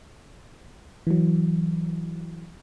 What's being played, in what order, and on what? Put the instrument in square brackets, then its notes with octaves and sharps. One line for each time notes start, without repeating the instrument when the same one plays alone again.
[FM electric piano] E3 F#3